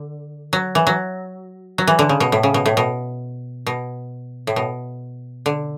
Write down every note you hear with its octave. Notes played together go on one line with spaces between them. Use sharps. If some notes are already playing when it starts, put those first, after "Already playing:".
Already playing: D3
F#3
E3
F#3
F#3
E3
D3
C#3
B2
A2
C#3
B2
A2
B2
B2
A2
B2
D3